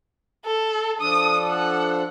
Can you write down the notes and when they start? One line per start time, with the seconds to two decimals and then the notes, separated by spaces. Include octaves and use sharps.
0.45 A4
1.01 F3 D4 A4 D#6
1.50 F#5